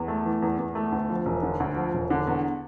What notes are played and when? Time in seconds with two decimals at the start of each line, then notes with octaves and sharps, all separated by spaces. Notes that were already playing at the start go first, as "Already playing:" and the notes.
Already playing: E2
0.08 A3
0.25 E3
0.42 E2
0.58 E2
0.75 A3
0.92 D2
1.10 F3
1.26 E1
1.43 D3
1.60 D2
1.76 F3
1.93 E1
2.10 D3
2.27 E2